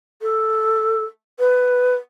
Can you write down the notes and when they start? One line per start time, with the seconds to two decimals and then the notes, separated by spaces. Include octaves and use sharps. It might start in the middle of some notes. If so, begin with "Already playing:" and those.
0.22 A4
1.39 B4